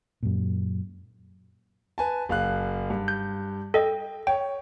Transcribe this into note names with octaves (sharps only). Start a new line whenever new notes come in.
F#2 A#2
B4 G#5 A5
F#1 F5 F#6
G2
G6
A4 D#5 G5
C#5 G5